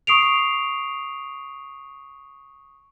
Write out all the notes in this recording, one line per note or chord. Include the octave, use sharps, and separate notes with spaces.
C#6 D#6 C7 D7 F7